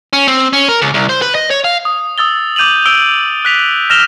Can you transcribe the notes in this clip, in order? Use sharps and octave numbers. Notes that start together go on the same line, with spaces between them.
C#4
C4
C#4
A#4
C#2
C2
C5
B4
D#5
C#5
F5
D#6
D#6 E6 A6 G7
D6 G6 D#7 F7 F#7
E6 D7 G7
F#6 B6 F7
F6 A#6 E7 F7 G7